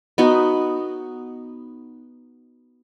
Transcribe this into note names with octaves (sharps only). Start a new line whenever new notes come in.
B3 D#4 F#4